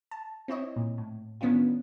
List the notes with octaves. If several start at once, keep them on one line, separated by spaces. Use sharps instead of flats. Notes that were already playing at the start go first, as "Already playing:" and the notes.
A5
C4 E4 C#5 D#5
A#2
A2
D#3 B3 C#4 D4 F4